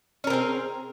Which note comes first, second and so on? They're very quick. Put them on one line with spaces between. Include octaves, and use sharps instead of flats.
C#4 A#4 C4 G#4